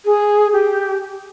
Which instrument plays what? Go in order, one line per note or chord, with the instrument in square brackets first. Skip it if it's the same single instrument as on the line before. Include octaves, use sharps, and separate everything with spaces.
[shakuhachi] G#4
G4